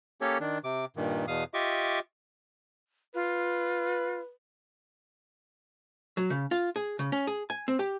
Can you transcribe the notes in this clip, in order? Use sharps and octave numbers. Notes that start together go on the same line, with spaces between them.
A#3 C#4 G4 A4 C#5
D#3 D4
C3 D6
G2 A#2 D#3
E2 B2 F5 D#6
F4 G4 D#5 E5 C#6 D6
F4 B4
F#3
C#3
F4
G#4
C#3
C#4
G#4
G#5
C4
G4